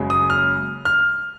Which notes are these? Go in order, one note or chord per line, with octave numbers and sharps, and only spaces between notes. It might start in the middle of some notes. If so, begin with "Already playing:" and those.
Already playing: F#1 F#2 C#3 G#3
D#6
F6
F6